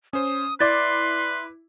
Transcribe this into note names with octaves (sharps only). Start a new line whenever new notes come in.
C#4 C5 D#6
E4 B4 D5 C6 D6 A6